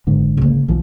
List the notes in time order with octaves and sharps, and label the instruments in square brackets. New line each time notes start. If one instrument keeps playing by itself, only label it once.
[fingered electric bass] F#1 G#2 D3
[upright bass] C#3 A#3
[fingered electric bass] B1 E3 F3 [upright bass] B3